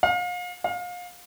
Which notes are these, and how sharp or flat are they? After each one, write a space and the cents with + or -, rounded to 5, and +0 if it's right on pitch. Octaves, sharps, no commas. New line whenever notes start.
F5 +35
F5 +30